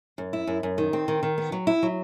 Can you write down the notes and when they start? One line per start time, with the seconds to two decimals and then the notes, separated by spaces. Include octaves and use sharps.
0.18 F#2
0.33 E4
0.47 F#2
0.63 F#2
0.78 D#3
0.93 C4
1.08 D#3
1.23 D#3
1.38 B3
1.52 F#3
1.67 E4
1.83 F#3